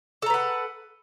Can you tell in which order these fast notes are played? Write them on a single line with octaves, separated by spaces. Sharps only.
A4 A#5 B4 F#5